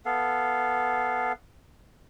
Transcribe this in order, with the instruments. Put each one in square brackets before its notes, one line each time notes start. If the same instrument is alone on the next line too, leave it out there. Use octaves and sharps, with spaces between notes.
[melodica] B3 A4 F5